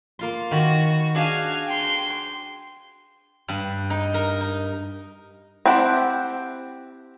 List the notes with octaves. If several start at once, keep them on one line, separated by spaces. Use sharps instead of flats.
A#3 F4 C6
D#3 F#4 B5
D4 F#4 G#4 F5 G#5
G5 C6
G2
D#4
A#4
D#4
C4 E4 G4 F#5 A5